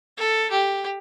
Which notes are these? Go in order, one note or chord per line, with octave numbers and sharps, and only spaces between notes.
A4
G4